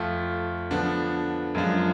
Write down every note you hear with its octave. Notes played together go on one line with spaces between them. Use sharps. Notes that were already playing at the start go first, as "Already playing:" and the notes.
Already playing: F2 F3 A3 F4
D3 F3 B3 D4
F#2 F3 G#3 D4 F4